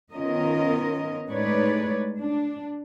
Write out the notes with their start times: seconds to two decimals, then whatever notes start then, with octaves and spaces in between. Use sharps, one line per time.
0.12 D#3 B3 C#4 F4 A#4 D#5
1.29 A2 G#3 D#4 B4 C#5 D5
2.20 D4